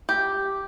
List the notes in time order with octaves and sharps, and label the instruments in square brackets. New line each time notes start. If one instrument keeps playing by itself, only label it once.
[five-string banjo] G4